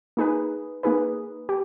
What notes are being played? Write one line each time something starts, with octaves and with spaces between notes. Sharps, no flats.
A#3 D#4 G#4 B4
A#3 D#4 G#4 B4
G4